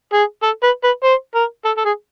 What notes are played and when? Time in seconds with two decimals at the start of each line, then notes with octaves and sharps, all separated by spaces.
0.13 G#4
0.43 A4
0.63 B4
0.84 B4
1.04 C5
1.35 A#4
1.65 A4
1.77 A4
1.85 G#4